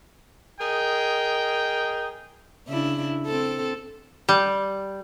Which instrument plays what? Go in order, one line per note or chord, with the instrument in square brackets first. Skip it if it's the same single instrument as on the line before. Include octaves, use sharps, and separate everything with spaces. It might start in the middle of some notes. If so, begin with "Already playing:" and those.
[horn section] G#4 A#4 D#5 G5
[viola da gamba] C#3 D4 E4
C4 A4
[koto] G3